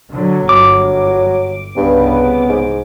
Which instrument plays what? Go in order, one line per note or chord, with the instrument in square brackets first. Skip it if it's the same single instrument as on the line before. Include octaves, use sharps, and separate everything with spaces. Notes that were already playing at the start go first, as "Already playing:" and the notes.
[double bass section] D3 F#3
[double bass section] G1 [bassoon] F#3 [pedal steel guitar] D6
[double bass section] C2 [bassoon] G2 [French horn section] C#3 B3
[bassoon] G#2